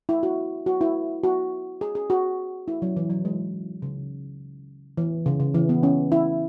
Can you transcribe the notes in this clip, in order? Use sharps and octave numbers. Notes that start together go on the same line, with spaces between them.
E4
F#4
F#4
E4
F#4
G#4
G#4
F#4
E4
F#3
E3
F#3
G#3
C#3
E3
C#3
C#3
E3
B3
C#4
E4